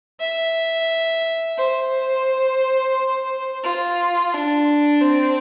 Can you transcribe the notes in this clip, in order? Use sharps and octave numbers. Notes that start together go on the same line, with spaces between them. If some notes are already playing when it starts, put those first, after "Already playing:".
E5
C5
F4
D4
C4